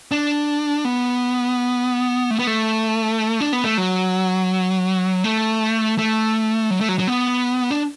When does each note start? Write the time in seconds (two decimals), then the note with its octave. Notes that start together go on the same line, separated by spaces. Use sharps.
0.11 D4
0.85 B3
2.30 A3
2.39 B3
2.47 A3
3.40 D4
3.53 B3
3.64 A3
3.78 F#3
5.24 A3
5.98 A3
6.70 F#3
6.81 A3
6.89 F#3
6.99 F#3
7.07 B3
7.70 D4